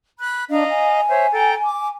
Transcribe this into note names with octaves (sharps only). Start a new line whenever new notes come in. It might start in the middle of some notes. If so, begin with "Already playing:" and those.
B5 F#6
D4 D#5 F5 A#5
G#5
C5 C#5 E5
A4 G5 A#5
D6